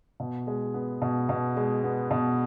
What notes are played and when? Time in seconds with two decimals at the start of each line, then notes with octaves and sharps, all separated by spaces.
0.20 B2
0.47 G#3
0.74 B3
1.02 B2
1.29 B2
1.57 G#3
1.83 B3
2.11 B2